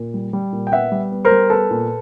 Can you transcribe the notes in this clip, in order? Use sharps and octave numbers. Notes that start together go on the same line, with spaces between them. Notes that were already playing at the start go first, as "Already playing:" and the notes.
Already playing: A#2
G3
G3
A#2
G5
B3 E5 F#5
G3
B3
A#4 C5
G3
B3 A4 B4
A#2